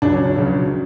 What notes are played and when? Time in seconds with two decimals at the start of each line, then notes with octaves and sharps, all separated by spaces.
0.02 C#2 C#3 F#3 D4
0.14 C#4
0.26 D4
0.36 C#2 C#3 F#3